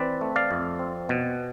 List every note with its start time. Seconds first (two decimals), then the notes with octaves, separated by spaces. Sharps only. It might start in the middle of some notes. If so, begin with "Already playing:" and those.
Already playing: E3 C4 B4 D5
0.21 A3
0.36 D5 F5
0.51 F2
0.79 C4
1.09 B2